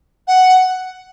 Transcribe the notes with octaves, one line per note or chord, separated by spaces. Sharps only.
F#5